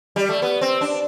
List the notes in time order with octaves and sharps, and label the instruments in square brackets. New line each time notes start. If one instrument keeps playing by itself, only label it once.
[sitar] G3
A3
B3
C4
D4